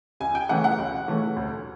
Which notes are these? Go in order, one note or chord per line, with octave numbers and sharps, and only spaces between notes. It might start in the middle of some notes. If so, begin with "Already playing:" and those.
C#2 G#5
G5
C#3 E3 A3 C#4 F#5
F#5
C#2
C#3 E3 A3 C#4
D2